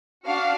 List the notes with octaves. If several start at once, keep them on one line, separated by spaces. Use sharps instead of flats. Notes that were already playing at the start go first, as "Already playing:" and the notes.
D4 F#4 F5